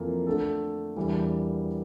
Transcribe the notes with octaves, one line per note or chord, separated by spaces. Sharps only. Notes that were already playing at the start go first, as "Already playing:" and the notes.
Already playing: F2 E3 A#3 F4 A4
D3 A3 D4 A4
E2 E3 G3 A#3 D4